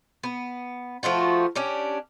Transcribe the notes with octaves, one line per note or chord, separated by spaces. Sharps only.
B3
F3 A3 F4 F#4
C#4 D4 G4